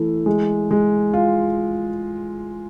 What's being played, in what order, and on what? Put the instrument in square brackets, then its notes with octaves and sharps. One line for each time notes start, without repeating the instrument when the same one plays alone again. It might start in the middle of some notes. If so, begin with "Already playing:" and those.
Already playing: [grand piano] E3 A3 E4
G#3
G#3
F4